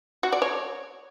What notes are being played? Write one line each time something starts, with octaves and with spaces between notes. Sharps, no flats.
F#4
D5
C#5